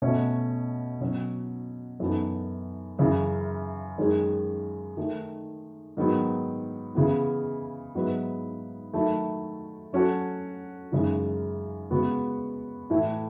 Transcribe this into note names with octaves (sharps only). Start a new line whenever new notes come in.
B2 A3 C#4
B2 F#3 C#4 F#4
F#2 E3 B3 D#4 A4
F#2 C#3 E3
F#2 D#3 G#3 C#4 G#4
D#3 A3 D#4
G#2 D#3 F#3 B3
C#3 E3 B3
G#2 F#3 B3 E4 B4
D#3 F#3 A3 E4 A4
F#3 C#4 F#4 A4
F#2 C#3 E3 G#3 D#4
C#3 G#3 B3 F#4 B4
A2 E3 A3